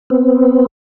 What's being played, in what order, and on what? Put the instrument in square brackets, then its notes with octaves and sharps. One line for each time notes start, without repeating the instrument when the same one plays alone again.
[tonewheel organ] B3 C4